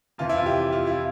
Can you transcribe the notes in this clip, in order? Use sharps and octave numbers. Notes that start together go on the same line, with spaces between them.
F2 C3 E3 F4
E4
F4
G4
F4
E4